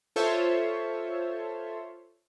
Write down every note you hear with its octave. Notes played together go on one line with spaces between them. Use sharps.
F4 A4 C5 C#5 E5